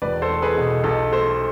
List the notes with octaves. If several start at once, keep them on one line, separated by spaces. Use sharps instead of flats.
E1 B4 D5
A4 C5
A3
G#4 B4
B2
B1 A4
A3 A4 C5